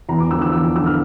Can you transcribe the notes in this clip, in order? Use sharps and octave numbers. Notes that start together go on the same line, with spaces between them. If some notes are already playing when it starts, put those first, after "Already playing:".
E2 A#5
D6
D3 F3 E6
E6
E2 E6
D6
D3 F3 E6
F6